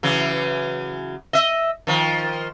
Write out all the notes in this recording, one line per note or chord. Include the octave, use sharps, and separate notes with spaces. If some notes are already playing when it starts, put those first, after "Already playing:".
C#3 E3 F#3
D#5 E5
D#3 F3